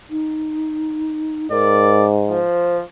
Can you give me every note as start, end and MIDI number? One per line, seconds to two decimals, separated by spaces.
0.10 1.51 63
1.51 2.42 44
1.51 2.03 70
1.51 2.09 74
2.29 2.83 53
2.29 2.77 72